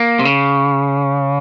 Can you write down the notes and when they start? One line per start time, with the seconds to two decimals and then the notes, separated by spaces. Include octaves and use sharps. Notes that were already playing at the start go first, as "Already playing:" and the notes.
Already playing: A#3
0.19 C3
0.25 C#3